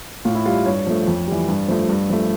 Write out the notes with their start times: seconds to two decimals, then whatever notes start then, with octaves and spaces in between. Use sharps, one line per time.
0.25 A2 F4
0.35 E4
0.45 G3 F4
0.66 G2 C#5
0.87 F3 A3
1.08 F2
1.27 E3 G3
1.48 G2
1.68 F3 A3
1.89 G2
2.10 F3 A3